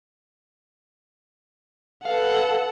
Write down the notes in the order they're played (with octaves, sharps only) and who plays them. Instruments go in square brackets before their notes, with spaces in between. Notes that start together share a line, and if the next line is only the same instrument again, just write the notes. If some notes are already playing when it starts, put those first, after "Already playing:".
[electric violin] A4 F#5 [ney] B4 [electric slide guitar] F5